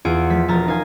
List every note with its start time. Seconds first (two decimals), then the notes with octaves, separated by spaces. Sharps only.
0.05 E2 F4 G#4 C#7 D7
0.30 F3 A3 B6
0.48 E1 F3 A#4 A5 A#5
0.68 D#4 A#4 F5 G#5